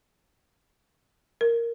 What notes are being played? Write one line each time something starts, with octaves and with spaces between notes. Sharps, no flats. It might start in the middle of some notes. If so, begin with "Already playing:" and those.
A#4